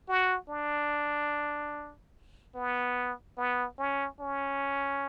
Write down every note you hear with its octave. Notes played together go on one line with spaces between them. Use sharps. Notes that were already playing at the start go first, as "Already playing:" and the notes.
F#4
D4
B3
B3
C#4
C#4